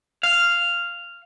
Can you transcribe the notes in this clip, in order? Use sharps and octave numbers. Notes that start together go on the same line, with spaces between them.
F5